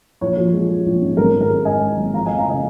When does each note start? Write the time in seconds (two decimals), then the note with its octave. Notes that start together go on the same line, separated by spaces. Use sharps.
0.21 A#1 C#5
0.37 F3
0.53 G#3
0.69 G#3
0.86 A#1
1.02 G#2
1.17 G#1 A#4
1.34 G#1
1.41 A#4
1.49 G#3
1.65 G#2 D#5 G#5
1.81 G#3
1.97 G#1
2.14 F3 F5 A#5
2.26 F1 D#5 G#5
2.38 F5 A#5
2.45 C#3 D#5 G#5